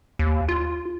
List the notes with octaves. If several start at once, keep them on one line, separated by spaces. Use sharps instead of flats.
D#2
F4